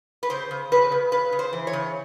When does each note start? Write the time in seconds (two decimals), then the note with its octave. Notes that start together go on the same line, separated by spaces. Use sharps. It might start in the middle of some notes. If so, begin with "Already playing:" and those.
0.23 B4
0.30 C#3 C5
0.51 C#3
0.72 C#3 B4
0.92 C#3
1.12 C#3 B4
1.32 C#3
1.39 C5
1.53 E3
1.67 C#5
1.73 C#3